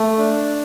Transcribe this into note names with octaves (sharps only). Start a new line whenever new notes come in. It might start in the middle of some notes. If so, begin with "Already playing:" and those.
Already playing: A3
D4